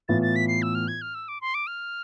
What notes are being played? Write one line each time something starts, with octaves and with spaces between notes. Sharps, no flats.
A2 E3 B3 F4 A6
A6
B6
C7
E6
F6
G#6
F6
E6
D6
C6
D6
F6